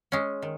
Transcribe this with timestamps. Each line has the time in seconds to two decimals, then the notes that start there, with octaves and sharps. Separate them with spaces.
0.12 G#3 C#4
0.42 D#3